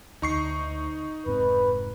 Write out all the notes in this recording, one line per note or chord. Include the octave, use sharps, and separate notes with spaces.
D2 D#4 C#6 C7
F1 G#2 C4 B4